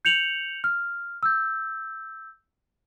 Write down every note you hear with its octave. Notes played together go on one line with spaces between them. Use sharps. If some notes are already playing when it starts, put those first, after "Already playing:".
G6 C#7 F7 F#7
F6
E6 G6